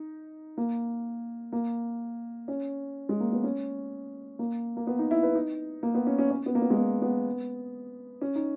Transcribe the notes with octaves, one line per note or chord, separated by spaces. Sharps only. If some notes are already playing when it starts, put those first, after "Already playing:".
Already playing: D#4
A#3
A#3
C#4
G#3
A#3
B3
C#4
A#3
A#3
B3
D#4
E4
B4
D#4
A#3
B3
C#4
C#4
C#4
B3
A#3
B3
G#3
A#3
B3
C#4
D#4